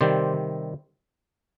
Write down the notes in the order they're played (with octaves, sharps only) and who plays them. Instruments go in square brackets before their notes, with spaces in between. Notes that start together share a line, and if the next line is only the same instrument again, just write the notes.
[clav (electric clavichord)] C3 D#3 G3 C4 C5 D5